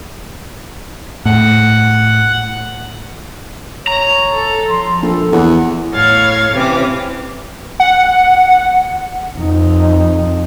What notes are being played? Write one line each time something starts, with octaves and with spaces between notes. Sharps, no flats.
A2 F#5
C#5 A#5
A4
F3 C6
A#1 A4
E2 F#5
A2 C#5 F5 G#6 A6
C3 E3 C#4 G4 D6
F#5
F2 D#4